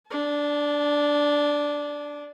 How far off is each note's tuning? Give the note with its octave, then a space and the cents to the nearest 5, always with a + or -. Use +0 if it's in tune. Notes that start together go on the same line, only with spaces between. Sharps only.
D4 -5 A5 -40